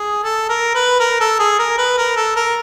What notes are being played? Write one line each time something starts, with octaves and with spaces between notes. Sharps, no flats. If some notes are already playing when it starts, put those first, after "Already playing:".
Already playing: G#4
A4
A#4
B4
A#4
A4
G#4
A#4
B4
A#4
A4
A#4